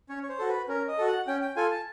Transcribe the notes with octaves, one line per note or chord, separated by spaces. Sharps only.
C#4 C#5
C#5
C5
F#4 A4
B4
C#4 A#4
D#5
F#4 A4
F#5
C#4 G5
G5
F4 A4 G#5
A5